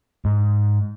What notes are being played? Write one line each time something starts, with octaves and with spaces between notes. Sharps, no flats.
G#2